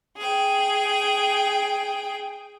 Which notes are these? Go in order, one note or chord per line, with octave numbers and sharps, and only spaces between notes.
G#4 G5